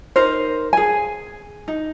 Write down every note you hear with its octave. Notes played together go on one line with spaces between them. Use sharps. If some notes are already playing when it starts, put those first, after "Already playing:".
D#4 A#4 C5
G#4 G#5
D#4